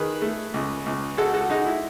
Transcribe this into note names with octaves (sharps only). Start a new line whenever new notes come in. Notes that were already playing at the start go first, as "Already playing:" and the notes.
Already playing: D#3 G#4 B4
A3
C#2
C#2
G#3 F#4 A4
F#4 A4
G#3 D#4 F#4
E4